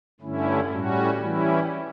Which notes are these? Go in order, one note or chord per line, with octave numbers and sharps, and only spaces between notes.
G2 D3 A3 C#4 E4
A2 G3 C#4 F#4
E3 G3 C#4 E4